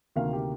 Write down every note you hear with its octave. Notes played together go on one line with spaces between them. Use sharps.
D2 C3 D#3 A#3 F5
G4